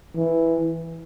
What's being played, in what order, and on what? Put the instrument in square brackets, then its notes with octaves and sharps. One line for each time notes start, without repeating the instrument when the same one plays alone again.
[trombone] E3